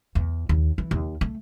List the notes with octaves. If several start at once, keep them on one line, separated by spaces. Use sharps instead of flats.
E2
D#2
E3
D#2
A3